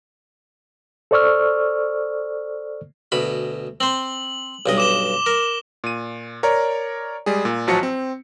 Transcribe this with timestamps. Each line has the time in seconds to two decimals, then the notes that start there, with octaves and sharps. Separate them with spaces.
1.11 A4 C5 D5 C#6 E6 F6
3.12 D2 B2 B5
3.80 C4 C5 F#7
4.66 B1 G2 D#5
4.78 D6 E7 G7
5.26 A#4
5.84 A#2 D#7
6.43 A#4 C#5 D5 A#5
7.26 G3 G#3 G#4
7.45 A#2
7.67 A1 F3 F#3 F#4 A5 C#7
7.83 C4